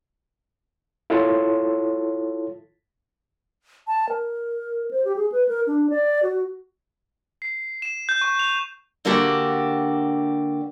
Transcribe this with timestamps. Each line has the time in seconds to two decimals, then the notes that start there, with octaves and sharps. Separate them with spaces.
1.10 E4 F4 A4 C#5 A5 C6
3.87 A5
4.09 A#4
4.91 C5
5.05 G4
5.16 G#4
5.32 B4
5.48 A#4
5.67 D4
5.90 D5
6.23 F#4
7.42 C7
7.82 E7
8.09 G6
8.21 C#6
8.39 F7
9.05 D3 A#3 D4 F#4 G4